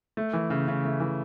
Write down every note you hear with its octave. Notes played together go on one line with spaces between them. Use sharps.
A3
E3
C#3
C#3
A3
E3